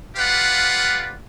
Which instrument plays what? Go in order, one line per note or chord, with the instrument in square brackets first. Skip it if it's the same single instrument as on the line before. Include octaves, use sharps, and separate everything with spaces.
[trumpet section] F4 G4 B4 D5 F5 F#5